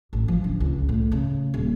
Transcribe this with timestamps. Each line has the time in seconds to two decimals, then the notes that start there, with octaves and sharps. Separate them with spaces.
0.13 A1
0.28 F3
0.44 D3
0.60 C#2
0.89 A2
1.12 C#3
1.54 D#1